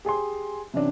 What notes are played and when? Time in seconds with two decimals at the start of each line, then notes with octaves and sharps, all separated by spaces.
0.05 G4 G#4 G#5 C6
0.74 C3 E3 C#4 D4